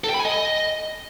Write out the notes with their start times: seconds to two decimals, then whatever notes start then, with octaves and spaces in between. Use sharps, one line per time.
0.04 A4
0.09 G5
0.14 B5
0.19 G#5
0.25 D#5